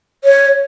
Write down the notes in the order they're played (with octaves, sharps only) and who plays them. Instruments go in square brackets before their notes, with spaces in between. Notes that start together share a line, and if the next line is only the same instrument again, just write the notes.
[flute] C#5